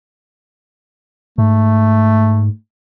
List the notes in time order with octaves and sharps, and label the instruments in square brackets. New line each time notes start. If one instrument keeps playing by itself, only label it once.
[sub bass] G#2 [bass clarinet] A3